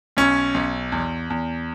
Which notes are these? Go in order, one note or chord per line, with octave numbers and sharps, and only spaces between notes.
B1 C#4
B1
E2
E2